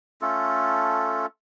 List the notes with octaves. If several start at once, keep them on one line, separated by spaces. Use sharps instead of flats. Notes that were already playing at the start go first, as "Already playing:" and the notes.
A3 C#4 F4 A4